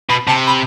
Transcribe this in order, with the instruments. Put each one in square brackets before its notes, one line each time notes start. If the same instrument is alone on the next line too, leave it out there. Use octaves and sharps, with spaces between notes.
[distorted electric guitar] B2 [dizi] B5
[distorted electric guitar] C3 [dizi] A5
[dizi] B5